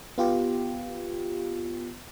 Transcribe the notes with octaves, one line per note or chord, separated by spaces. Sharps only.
B3 F4 G4